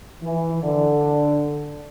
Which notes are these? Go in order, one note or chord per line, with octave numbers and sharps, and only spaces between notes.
E3
D3